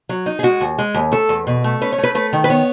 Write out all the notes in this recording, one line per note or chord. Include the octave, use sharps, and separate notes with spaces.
F#3
D#4
G#4
G#3 F#4
D#2
G#3
D#2
A3 A4
E2
B2
A3
C#4 B4
C#5
A3
B4
A3 B4
D#3
B4
B3 C#5